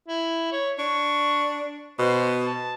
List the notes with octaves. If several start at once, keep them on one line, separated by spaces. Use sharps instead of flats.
E4
C#5
D4 C#6
B2 C5
A5